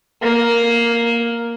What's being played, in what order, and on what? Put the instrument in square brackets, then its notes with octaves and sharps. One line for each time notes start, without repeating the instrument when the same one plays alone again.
[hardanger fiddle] A#3